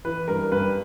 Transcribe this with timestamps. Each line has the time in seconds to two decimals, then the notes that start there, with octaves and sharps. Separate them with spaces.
0.05 E3 B4
0.28 G2 A#4
0.52 G2 B4